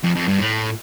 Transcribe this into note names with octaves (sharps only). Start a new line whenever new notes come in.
F2
F2
G2
A2